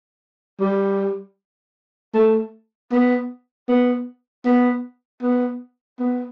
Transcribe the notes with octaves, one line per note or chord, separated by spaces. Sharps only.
G3
A3
B3
B3
B3
B3
B3